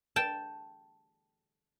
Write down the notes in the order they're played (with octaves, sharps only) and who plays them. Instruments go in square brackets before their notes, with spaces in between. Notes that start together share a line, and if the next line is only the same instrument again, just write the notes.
[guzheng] G5 A5